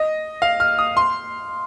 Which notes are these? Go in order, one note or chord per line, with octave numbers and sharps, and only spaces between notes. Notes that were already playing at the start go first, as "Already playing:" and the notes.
Already playing: D#5
F5
F6
D#6
C6